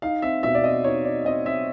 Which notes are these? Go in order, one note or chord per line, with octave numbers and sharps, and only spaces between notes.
D#4 F5
C4 E5
B2 E5
D5
C4 D#5
D#4 C#5
D#4 D5
C4 D#5
C4 E5